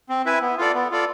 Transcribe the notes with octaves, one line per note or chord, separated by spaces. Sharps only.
C4
E4 B4 E5 G#5
B3
F4 A4 D5
B3
F4 A4 D5